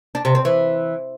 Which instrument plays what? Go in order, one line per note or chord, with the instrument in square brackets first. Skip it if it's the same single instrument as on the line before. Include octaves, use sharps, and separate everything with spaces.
[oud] D4
C3
C4
E3